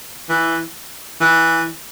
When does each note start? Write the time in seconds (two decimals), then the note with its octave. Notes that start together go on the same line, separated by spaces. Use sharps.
0.29 E3
1.20 E3